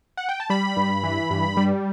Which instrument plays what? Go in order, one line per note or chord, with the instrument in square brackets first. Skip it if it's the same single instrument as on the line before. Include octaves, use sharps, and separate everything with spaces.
[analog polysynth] F#5
G5
A5
G3 B5
G2
E3
G2
G3